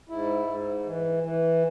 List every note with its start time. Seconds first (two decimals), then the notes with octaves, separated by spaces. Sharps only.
0.09 G#2 E4
0.47 G#2
0.85 E3
1.23 E3